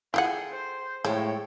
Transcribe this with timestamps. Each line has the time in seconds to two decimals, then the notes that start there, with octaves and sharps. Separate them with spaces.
0.14 E4 F4 G#4 A4 F#5 G5
0.50 C5
1.04 A2 F3 G#3 A4 C#5 G5